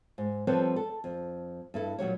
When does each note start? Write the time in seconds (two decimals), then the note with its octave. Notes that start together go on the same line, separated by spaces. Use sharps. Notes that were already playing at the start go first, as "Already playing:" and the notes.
0.18 G#2
0.47 F3 G3 C4 A4 B4 C#5
0.76 A4
1.04 F2
1.74 G2 E4 A4
1.99 A#2 F#3 G3 C#5